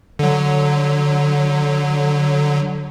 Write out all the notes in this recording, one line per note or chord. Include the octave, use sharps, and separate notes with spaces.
D3 F#3